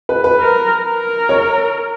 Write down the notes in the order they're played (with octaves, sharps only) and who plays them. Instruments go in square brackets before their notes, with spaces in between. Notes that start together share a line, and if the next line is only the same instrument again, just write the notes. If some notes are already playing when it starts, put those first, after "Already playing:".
[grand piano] B4
B4
[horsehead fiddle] A#4
A#4
[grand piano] C#5